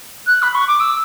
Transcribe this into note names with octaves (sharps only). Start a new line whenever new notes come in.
F#6
B5
C#6
D6
E6